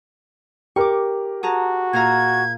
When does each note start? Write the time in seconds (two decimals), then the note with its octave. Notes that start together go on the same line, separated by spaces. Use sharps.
0.76 G4 A#4 C#6 D6
1.43 F#4 G#4 A5 A#5
1.93 A#2 F5 A#5 G#6